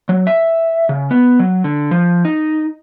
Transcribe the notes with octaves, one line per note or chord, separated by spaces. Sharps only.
F#3
E5
C#3
B3
F#3
D3
F3
D#4